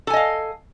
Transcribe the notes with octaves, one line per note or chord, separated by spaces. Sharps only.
A4 D#5 F5 G#5